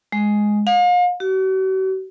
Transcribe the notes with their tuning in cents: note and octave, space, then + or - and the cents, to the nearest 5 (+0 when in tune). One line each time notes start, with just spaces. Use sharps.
G#3 +5
F5 +40
F#4 +45